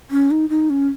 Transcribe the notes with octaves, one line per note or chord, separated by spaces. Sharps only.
C#4
D#4
D#4
C#4